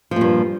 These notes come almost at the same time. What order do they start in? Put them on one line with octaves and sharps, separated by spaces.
F3 A#2 G2